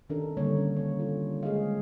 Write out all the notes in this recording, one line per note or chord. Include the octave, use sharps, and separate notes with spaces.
C3 D#3 C#4 D4 A4 A#4
D3 G3 A#3 C#5
C#4
C#5
F4
G#3 G#4 C5 D#5 F5